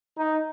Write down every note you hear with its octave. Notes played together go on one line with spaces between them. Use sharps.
D#4